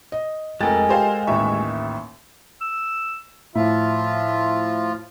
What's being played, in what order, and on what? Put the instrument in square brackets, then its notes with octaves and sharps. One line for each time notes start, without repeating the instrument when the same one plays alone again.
[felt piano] D#5
[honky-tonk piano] F1 A6 [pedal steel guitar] G#3 [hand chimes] F4 G#5 [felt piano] A4 A#4 G5
[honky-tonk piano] G4 C5 F5
[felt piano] A1 D#2 [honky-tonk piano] F4 E5 [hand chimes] C#6
[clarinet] E6
[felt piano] A2 [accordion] F3 F4 [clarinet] E5